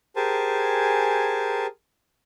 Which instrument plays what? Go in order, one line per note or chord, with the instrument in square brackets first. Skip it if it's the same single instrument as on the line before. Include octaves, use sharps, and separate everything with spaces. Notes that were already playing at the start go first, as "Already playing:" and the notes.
[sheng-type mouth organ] G4 G#4 A#4 C5 G#5 A5